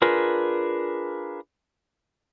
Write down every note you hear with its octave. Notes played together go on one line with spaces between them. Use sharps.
D4 F4 G#4 A#4 B4